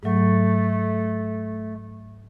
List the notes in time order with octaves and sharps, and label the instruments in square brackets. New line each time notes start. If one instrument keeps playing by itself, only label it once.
[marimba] G#2 F#3 [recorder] A3